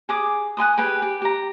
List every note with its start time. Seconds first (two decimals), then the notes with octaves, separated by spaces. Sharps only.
0.09 G#4 D6 D#6
0.57 F#5 G#5 C6 D#6
0.77 G4 G#4 B4 G5
1.02 G4
1.22 G4 A#5